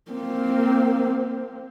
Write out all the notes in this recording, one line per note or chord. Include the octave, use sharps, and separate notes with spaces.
A#3 C4